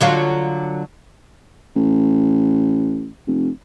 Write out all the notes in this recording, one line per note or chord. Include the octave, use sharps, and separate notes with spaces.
D3 F#3 F4
A1
F1